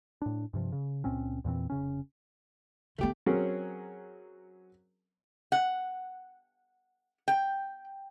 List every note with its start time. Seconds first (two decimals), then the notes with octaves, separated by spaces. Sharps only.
0.22 A2 D4
0.53 G2 C3 F3
0.72 C#3
1.04 C#2 A#2 C4 C#4
1.44 E2 A#2 E3 C4
1.70 F1 C#3 C#4
2.98 D3 A3 B3 G4
3.26 F#3 C4 C#4 G#4 A#4
5.52 F#5
7.28 G5